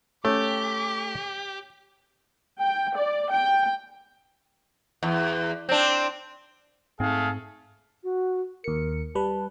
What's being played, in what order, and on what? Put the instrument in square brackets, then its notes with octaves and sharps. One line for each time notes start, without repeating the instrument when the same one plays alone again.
[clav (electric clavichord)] A3 [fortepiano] C#4 [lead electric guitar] G4 [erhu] D6
[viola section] G5
D5
G5
[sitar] E2
C4 D4
[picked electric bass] G#2 C4 [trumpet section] A3 G#4 F5
[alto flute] F#4
[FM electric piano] D#2 C#7 [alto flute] A#4
[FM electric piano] G3 B4 [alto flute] A5